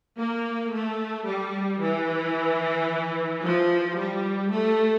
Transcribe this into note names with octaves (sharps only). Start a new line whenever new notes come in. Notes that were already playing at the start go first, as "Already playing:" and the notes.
A#3
A3
G3
E3
F3
G3
A3